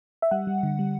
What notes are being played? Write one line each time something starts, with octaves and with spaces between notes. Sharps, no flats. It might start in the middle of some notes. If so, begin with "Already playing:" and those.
E5
G3 F#5
G3
D3
G3